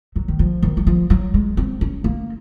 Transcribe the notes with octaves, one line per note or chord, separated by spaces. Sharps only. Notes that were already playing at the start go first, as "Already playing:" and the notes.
F#3
D#3
F3
D#3
F#3
F3
F#3
G#3
C4
C#4
A#3